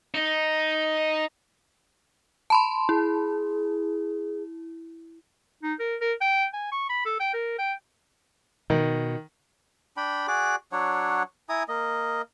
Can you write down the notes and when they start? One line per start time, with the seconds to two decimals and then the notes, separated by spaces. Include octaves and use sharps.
0.14 D#4
2.50 A5 B5 C6
2.89 E4 G#4
5.63 D#4
5.80 A#4
6.01 A#4
6.21 G5
6.53 G#5
6.72 C#6
6.89 B5
7.06 A4
7.20 G5
7.34 A#4
7.59 G5
8.70 B2 D#3
9.97 D4 G5 B5
10.28 F#4 G#4 D5 D6
10.72 F#3 D4 C#5 F#5
11.49 E4 G#5 A#5 D#6
11.68 A#3 D#5